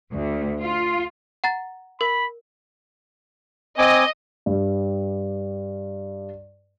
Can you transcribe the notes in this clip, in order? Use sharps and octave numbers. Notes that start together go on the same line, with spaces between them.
D2
F4
F#5 A#5 A6
A#4 B5
C4 D#5 G#5 D6
G2 G3